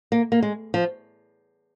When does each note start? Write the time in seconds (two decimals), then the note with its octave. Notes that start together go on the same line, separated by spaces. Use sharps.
0.12 A#3
0.32 A#3
0.43 G#3
0.74 F3